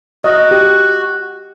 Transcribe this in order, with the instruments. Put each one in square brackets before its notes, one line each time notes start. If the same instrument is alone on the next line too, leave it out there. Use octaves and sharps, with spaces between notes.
[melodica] F#4 [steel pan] D#5
[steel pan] G4